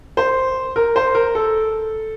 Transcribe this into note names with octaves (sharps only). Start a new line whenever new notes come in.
C5
A#4
C5
A#4
A4